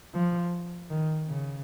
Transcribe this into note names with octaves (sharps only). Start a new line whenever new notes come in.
F3
D#3
C#3